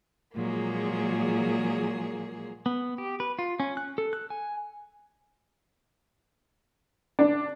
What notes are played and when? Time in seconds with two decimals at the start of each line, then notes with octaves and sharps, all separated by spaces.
0.35 A#2 F3 F#3 G#3 A#3 G#4
2.66 B3
2.98 G4
3.20 B4
3.39 F4
3.60 C#4
3.77 F#6
3.98 A4
4.13 F#6
4.30 G#5
7.19 D4